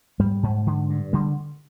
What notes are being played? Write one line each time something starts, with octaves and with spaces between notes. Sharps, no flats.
G#2 G3
G#2
D3
G2
D3 G3